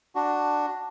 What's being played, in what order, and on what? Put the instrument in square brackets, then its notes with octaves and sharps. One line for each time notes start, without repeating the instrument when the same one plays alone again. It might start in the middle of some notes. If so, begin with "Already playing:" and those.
[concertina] D4 F#4